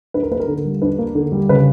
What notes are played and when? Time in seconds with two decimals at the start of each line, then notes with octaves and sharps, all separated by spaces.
0.14 D4 B4
0.23 A#4
0.31 A#3 B4
0.40 A#4
0.47 D3
0.65 G3
0.82 D4 B4
0.99 A#3
1.15 D3
1.32 G3
1.49 C#3 B4